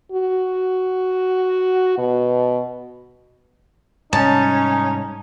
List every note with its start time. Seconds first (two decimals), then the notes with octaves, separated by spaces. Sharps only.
0.12 F#4
1.98 B2
4.13 G#2 C3 G3 C#4 D#4 C#5 A5